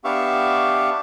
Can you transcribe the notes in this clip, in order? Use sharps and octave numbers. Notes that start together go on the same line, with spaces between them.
B3 D4 G4 E5 F5 C#6